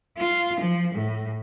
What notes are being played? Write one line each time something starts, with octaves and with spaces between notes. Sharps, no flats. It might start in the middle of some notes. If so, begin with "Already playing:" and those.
F4
F3
A2